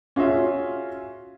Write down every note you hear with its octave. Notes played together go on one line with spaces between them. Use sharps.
C#4 F4 F#4 G#4 E5